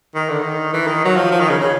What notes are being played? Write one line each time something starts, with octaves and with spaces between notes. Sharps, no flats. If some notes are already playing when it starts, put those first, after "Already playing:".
D#3
D3
D#3
E3
D#3
F#3
F3
F3
D#3
C#3
C#3